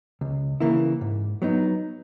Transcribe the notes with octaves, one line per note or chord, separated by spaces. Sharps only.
C#2
C#3 E3 A#3 E4
G#2
F#3 B3 D#4